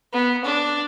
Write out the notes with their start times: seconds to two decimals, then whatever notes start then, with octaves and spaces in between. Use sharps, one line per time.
0.13 B3
0.45 D4